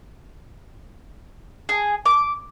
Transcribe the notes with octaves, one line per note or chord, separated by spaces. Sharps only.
G#4
D6